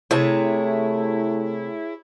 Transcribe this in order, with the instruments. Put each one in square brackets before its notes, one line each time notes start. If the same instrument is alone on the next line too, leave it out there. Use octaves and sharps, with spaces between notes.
[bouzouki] C3 [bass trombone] A3 [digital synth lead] E4 [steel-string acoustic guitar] G#4 C#5 A5